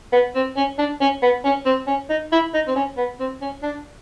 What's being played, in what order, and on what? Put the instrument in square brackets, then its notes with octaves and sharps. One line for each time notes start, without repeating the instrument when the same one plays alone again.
[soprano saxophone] B3
C4
C#4
D4
C#4
B3
C#4
C4
C#4
D#4
E4
D#4
C4
C#4
B3
C4
C#4
D4